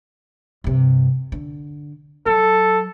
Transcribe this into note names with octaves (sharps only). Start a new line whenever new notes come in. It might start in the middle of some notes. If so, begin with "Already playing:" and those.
G2 C3
D3
F#3 A4